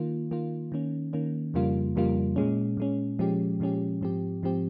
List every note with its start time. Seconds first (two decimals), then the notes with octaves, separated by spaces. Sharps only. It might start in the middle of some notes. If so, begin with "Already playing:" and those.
Already playing: D#3 A#3 F4
0.31 D#3 A#3 F4
0.72 D#3 A#3 C#4
1.13 D#3 A#3 C#4
1.54 F2 C#3 G3 A#3 F4
1.96 F2 C#3 G3 A#3 F4
2.36 A#2 G#3 C#4
2.77 A#2 G#3 C#4
3.19 A#2 F3 G#3 C#4 G4
3.60 A#2 F3 G#3 C#4 G4
4.01 G#2 F3 C4 G4
4.43 G#2 F3 C4 G4